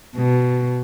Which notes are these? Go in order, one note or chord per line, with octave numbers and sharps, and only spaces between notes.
B2